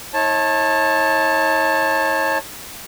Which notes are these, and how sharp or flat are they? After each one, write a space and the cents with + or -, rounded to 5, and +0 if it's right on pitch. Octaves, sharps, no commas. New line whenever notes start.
D#4 +45 C#5 -25 A5 +0